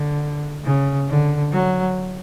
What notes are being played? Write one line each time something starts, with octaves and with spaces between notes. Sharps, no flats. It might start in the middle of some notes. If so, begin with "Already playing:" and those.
Already playing: D3
C#3
D3
F#3